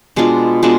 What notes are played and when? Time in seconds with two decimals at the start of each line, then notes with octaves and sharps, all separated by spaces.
0.16 B2 G#3 D4 F4
0.63 B2 G#3 D4 F4